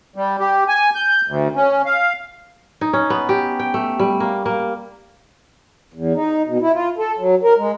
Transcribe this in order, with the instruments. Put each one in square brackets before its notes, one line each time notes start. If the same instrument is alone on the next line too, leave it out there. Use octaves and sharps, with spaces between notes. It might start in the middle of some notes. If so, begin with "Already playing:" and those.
[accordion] G3
G4
G#5
G6
D2
C#4
F5
[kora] D#4
C#4
B3
G4
G5
A3
G3
A#3
A#3
[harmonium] E2
D#4
B2
E4
F4
A4
F#3
A#4
G#3